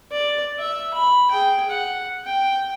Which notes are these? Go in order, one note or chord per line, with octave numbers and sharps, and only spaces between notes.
D5
E5
B5
G#4 G5
F#5
G5